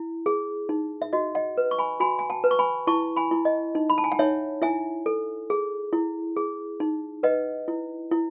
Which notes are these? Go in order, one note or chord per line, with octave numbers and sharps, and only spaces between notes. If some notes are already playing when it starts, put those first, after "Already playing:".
Already playing: E4
G#4
D#4
E5
F#4 D#5
D#5 F#5
B4
C#6
G#5 B5
F#4 G#5 B5
G#5
F#5 A5
B4
C#6
G#5 B5
E4 A5 C#6
G#5 B5
E4
D#5
D#4
B5
A5
G#5
F#5
D#4 C#5 E5
E4 E5 G#5
A4
G#4
E4
G#4
D#4
B4 D#5 F#5
E4
E4